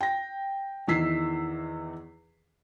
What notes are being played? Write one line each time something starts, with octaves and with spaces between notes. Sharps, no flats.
G5 A#6
E2 D#3 E3 E6 B6 C7